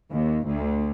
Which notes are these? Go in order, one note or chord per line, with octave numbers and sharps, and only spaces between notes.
D#2
D2